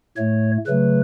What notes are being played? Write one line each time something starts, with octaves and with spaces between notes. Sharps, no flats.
A2 A3 C#5
C#3 F#3 A3 B4